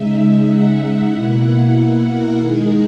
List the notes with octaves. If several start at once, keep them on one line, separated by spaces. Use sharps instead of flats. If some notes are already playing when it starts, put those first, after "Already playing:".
Already playing: C#3 G#3 D#4 E5
E5
F#5
B2 A#3 E4 F#5
F#5
A#4
D#3 G#3 D#4 G#4